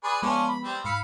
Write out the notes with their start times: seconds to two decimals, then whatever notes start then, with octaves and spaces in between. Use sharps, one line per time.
0.04 G#4 B4 D5 C6 D6 A6
0.22 F3 G#3 B3 C#4 D4 F4
0.48 B5
0.64 G3 C4
0.85 G#2 F5 B5 E6 C#7